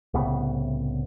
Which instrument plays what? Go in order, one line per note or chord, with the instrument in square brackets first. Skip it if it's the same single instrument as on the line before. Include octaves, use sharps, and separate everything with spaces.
[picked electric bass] C2 A2 C#3 B3